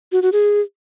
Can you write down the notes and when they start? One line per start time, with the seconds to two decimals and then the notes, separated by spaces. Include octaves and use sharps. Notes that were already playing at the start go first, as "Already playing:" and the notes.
0.12 F#4
0.22 F#4
0.33 G#4